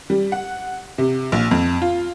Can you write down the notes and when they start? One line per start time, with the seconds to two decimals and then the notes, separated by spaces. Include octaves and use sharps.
0.10 G3
0.32 F#5
0.98 C3
1.32 A#1
1.51 F2
1.82 F4